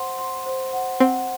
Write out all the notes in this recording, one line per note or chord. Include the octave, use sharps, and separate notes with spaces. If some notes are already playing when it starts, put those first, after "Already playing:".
Already playing: C5 F#5 C6
C6
C5
F#5
C4 F#5